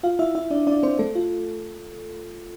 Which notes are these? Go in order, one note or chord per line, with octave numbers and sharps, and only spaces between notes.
F4 F5
E4 E5
E4 E5
D4 D5
D4 D5
C4 C5
A3 A4
F4